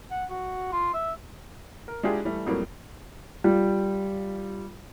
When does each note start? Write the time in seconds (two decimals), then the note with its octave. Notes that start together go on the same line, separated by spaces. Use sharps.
0.11 F#5
0.30 F#4
0.72 F4
0.94 E5
1.88 A#4
2.03 G#3 D4 E4 F4 G4 G#4
2.24 E3 G3 A3
2.46 F2 A2 F#3 G3 A#3
3.44 G3 F4